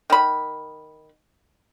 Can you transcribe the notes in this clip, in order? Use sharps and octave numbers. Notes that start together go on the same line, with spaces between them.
D#3 B5